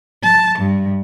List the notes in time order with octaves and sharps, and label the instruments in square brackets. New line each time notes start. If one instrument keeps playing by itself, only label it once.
[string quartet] A5
G2